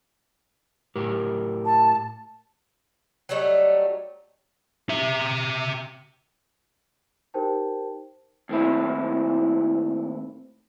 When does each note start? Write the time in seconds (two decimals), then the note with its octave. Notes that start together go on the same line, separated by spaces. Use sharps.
0.96 A2 G4 A#4
1.66 A5
3.29 F#3 G3 A3 D#4
4.89 G4 E5
7.34 D#4 G4 A#4 C5 G5 A5
8.49 D#2 A2 C4 E4